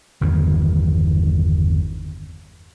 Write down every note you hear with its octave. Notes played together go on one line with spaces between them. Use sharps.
G1 E2 D#3 E3